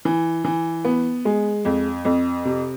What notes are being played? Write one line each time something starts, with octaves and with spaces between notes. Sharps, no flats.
E3
E3
B3
G#3
F2
F2
C3